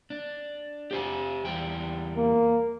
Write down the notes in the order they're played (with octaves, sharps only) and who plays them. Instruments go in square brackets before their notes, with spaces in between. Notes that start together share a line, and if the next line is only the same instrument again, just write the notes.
[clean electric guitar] D4
G4 C5 G#5
E2 G3 G5
[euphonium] A#3